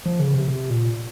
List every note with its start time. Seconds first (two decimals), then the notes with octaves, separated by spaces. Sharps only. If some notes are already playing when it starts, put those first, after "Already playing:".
0.06 F3
0.20 C#3
0.34 C3
0.48 C3
0.70 A#2